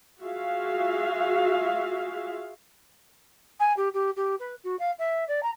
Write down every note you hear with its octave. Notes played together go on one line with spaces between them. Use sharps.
F4 F#4 G#4 E5 F5
G#5
G4
G4
G4
B4
F#4
F5
E5
D5
A#5